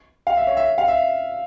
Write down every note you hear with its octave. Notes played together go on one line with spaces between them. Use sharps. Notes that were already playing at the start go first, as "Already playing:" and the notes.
F5
E5
C#5
E5
F5
E5